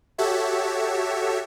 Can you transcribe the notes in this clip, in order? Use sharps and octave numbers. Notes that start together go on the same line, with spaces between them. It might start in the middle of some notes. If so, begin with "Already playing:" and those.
F#4 G4 A4 C#5 E5